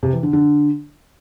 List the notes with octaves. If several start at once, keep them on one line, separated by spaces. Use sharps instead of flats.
C3
E3
D3
D3